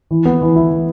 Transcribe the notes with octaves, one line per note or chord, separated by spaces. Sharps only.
E3
B3
E3
E4
E3